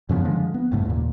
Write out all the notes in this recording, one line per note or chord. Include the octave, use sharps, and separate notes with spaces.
F#2 C#3 F3 B3
D3 F3 G#3
B3
A1 G#2 C#3 A3
D#2 A#2